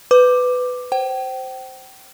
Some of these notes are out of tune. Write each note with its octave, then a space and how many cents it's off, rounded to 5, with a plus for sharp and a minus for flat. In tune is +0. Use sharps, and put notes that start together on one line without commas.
B4 +15 D6 +10
C5 +0 G5 -35